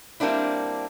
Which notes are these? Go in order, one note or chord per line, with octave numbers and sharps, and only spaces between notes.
G3 A#3 C4 D4 E4